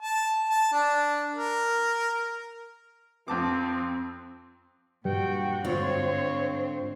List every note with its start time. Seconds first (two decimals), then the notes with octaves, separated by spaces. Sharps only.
0.02 A5
0.49 A5
0.73 D4
1.35 A#4
3.28 F2 C4 A5 D6
5.05 G2 A#2 F#4 G5
5.65 G#2 D3 C4 F4 C5 C#5